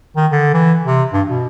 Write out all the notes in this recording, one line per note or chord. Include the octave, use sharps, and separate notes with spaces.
D#3
D3
E3
C3
G2
B2